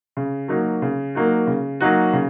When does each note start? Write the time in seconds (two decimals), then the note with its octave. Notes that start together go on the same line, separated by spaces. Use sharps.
0.17 C#3
0.48 F#3 A#3 D#4 F#4
0.82 C#3
1.15 F#3 A#3 D#4 F#4
1.47 C#3
1.81 F#3 A#3 D#4 F#4
2.13 C#3